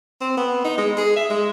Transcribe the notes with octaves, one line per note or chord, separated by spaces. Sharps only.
C4
B3
D#4
G#3
G#4
E5
G#3